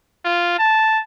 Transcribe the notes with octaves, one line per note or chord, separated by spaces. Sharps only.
F4
A5